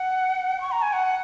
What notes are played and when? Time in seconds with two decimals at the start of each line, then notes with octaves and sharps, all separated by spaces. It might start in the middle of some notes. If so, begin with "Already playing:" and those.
Already playing: F#5
0.61 C#6
0.72 A#5
0.82 G#5
0.93 F#5